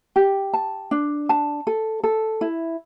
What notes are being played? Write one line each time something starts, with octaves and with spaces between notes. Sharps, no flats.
G4
A5
D4
A5
A4
A4
E4